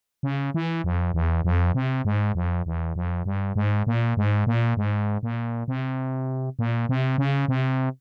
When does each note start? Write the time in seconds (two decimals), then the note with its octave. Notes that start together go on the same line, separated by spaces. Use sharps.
0.23 C#3
0.54 E3
0.84 F2
1.14 E2
1.45 F2
1.75 C3
2.05 G#2
2.35 F2
2.66 E2
2.96 F2
3.25 G2
3.56 G#2
3.87 A#2
4.17 G#2
4.47 A#2
4.77 G#2
5.23 A#2
5.68 C3
6.59 A#2
6.89 C3
7.18 C#3
7.48 C3